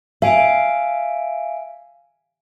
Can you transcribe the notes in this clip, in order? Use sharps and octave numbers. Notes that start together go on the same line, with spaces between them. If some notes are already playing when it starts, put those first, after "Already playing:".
E5 F5 G#5 D7